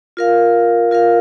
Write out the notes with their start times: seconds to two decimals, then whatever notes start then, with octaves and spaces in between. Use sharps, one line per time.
0.17 F4 A#4 F5
0.91 F4 A#4 F5